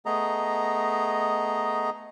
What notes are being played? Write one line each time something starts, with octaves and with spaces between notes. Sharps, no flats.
A3 B3 G#4 D#5 A#5